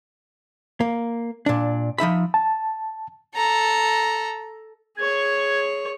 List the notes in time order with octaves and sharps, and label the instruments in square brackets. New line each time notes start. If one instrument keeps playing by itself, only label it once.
[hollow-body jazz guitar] A#3
A#2 D4
F3 D#4 E5 B5
[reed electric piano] A5
[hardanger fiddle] A4 A#5
[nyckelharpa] G#4 C#5 [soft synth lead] G#6